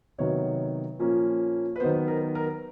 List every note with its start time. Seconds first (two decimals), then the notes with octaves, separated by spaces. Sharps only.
0.18 C3 D#3 F#3 B3 C#5
0.99 A#2 F3 A#3 C#4
1.76 B4
1.80 D#3 F#3 B3 C5
2.08 A#4
2.35 A#4